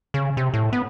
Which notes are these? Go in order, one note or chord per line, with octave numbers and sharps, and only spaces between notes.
C#3
C3
A2
B3